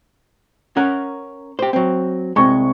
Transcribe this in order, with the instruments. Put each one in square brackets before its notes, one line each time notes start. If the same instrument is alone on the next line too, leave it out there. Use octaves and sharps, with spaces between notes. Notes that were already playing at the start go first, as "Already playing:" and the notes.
[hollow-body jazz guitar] C#4 A#4 F#5
G4 C5
F#3 C4
[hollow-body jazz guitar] C2 G#3 [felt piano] C4 C#6